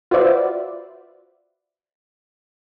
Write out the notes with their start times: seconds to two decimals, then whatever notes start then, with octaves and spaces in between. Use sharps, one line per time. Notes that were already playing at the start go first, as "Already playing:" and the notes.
0.11 F4 F#4 B4 C5 D5 E5